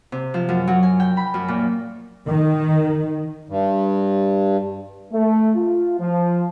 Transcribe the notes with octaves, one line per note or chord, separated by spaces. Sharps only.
C3
F3
F#2
F#3
G#5
G5
B5
F#2
A#2
D#3
G2
A3
F4
F3